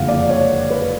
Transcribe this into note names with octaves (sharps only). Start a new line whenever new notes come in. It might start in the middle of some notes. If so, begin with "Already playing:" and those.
Already playing: F#1 F2 D3 G#3 F5 F#5
D5
C#5
B4